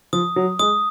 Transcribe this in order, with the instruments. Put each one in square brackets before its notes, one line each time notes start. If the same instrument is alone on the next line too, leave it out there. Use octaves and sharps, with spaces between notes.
[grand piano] F3 [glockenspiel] D#6
[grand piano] F#3
[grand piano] G#3 [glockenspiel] D#6